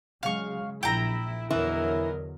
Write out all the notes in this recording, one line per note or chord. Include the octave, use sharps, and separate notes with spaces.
C#3 F#3 G#3 F5 C#6
A#1 E4 G5 A#5
E2 D3 E3 F#3 E4 A#4 D#5